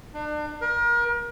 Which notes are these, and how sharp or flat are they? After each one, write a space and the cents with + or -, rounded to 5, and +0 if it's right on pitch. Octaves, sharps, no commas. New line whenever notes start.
D4 +35
A#4 +35